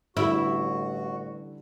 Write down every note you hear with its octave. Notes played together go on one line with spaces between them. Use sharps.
A1 D3 G3 E4 F#4 A4